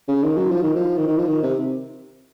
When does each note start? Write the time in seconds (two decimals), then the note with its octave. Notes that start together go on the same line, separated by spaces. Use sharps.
0.08 C#3
0.23 D#3
0.37 F#3
0.51 F3
0.63 D#3
0.76 F3
0.97 D#3
1.08 D#3
1.17 F3
1.27 D#3
1.43 C3